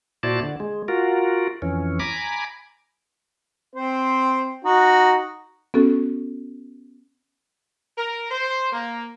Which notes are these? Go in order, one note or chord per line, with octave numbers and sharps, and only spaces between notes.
A#2 E4 F#4 C5 D5 A5
D3
G#3
F4 F#4 A#4
F2 E3 C#4
G#5 A#5 B5 D6
C4 C5
D#4 F#4
B3 C#4 F#4 A4
A#4
C5
A#3